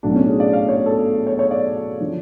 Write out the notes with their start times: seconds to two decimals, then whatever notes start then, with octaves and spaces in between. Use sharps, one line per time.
0.03 B1 A2 F#3 A3 D4
0.16 C#4
0.28 G#4
0.40 D5
0.53 F5
0.69 C#5
0.86 A4
1.27 C#5
1.39 C#5
1.51 D5
2.00 D3 F3